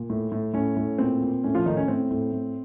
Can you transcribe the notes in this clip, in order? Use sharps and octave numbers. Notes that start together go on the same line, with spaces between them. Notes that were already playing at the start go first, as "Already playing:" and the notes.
Already playing: A#2
A2
A2
A2 C#4
A2
A#2 C4
A#2
A2 C#4
F3 F4
A2 D#3 D#4
C#4
A2 C4
A2
A2